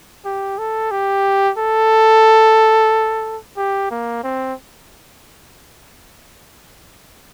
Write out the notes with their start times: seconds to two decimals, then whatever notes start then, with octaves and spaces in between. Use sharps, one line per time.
0.25 G4
0.58 A4
0.91 G4
1.58 A4
3.57 G4
3.91 A#3
4.24 C4